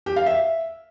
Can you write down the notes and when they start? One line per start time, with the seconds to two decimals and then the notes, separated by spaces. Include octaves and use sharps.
0.06 G4
0.16 F5
0.26 E5